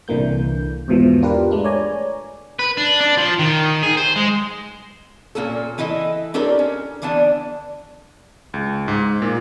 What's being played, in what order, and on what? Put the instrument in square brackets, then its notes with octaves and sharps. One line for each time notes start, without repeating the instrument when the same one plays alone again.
[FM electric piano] C2 D3 E3 A#3 G6
E2 G#2 B2 E3 F3
D4 F4 G4 A#4 B4
G#3 A3 D4
C#5 D5 G#5 A#5
[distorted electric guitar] B4
D4
D4
F3
D#3
G#4
C5
G#3
[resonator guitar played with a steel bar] A#2 A#3 C#4 A4
E3 E4 A4 D#5
C4 D4 G4 A4 A#4 C#5
C#4
D3 E3 B3 D4 A5
[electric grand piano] C#2
G#2
A#2